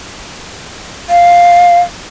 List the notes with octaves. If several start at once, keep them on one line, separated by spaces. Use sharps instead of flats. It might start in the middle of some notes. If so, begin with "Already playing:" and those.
F5